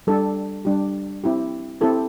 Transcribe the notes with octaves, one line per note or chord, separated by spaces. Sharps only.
G3 D4 G4 A4
G3 D4 G4
C4 E4 G4
C4 E4 G4 A4